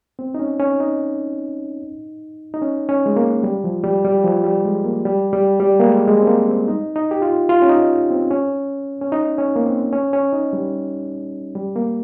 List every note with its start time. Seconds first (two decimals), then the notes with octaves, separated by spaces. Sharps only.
0.19 C4
0.35 D#4
0.39 C#4
0.60 C#4
0.80 D#4
2.54 D#4
2.62 C#4
2.89 C#4
3.06 G#3
3.16 A#3
3.43 G3
3.64 F3
3.84 G3
4.05 G3
4.24 F3
4.44 G3
4.65 G#3
4.85 A#3
5.05 G3
5.33 G3
5.60 G3
5.80 A#3
5.87 G#3
6.08 G#3
6.22 C4
6.27 A#3
6.48 C4
6.68 D#4
6.96 D#4
7.11 G4
7.22 F4
7.49 F4
7.62 C#4
7.69 D#4
8.10 C4
8.31 C#4
9.01 C#4
9.12 D#4
9.38 C#4
9.56 A#3
9.66 C4
9.93 C#4
10.13 C#4
10.33 D#4
10.53 G3
11.55 G3
11.76 A#3